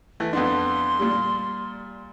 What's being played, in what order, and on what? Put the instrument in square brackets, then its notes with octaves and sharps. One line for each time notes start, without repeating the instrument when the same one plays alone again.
[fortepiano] E3 A3
[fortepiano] F2 B3 D4 [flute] C6
[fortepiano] A#2 G3